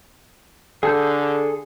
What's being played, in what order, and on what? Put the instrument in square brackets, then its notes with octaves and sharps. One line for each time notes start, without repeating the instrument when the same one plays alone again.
[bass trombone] D3 [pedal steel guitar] G#4 A4 G6